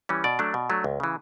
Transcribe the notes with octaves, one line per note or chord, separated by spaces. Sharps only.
E3 G3 C#4
B2 D5
F#3 A3 D4
B2
F#3 A3 D4
C#2
C#3 E3